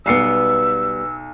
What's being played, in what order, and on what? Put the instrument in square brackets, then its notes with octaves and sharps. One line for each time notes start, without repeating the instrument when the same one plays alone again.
[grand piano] B1 C7 C#7 [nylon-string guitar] G3 B3 [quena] E6